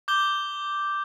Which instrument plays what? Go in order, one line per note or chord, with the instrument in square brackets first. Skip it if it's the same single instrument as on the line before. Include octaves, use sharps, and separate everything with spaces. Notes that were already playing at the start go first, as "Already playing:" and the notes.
[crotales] D6 G6 G7